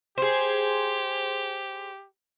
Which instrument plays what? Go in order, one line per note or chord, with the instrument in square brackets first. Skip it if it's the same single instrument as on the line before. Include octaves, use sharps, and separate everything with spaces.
[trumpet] G4 [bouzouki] G#4 C5